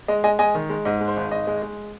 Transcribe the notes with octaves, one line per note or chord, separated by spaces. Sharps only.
G#3 D#5
G#3 D#5 G#5
G#3 D#5 G#5
D#3
G#3
G#2 D#5
G#3
C5
G#1
G#1 D#5
G#3
G#3